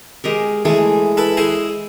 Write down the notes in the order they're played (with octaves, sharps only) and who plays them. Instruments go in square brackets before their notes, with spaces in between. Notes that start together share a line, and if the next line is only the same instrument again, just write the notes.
[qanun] G#3 G4 A#4
[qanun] E3 G#3 G#4 [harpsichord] A3
[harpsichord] E4 A4 B4
[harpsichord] E4 G#4 C5 [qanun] D#5